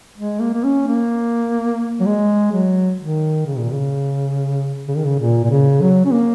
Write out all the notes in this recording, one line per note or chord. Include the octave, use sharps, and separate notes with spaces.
G#3
A#3
A#3
C#4
A#3
F#3
G#3
F#3
D#3
C#3
A#2
C#3
C#3
D#3
C#3
A#2
A#2
C#3
F#3
C#4
A#3